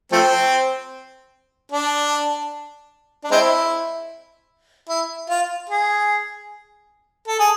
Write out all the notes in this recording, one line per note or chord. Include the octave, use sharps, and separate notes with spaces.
F3 A3 C4
D4
D4
G#3 C4 E4
E4
F4
G#4
A4
G#4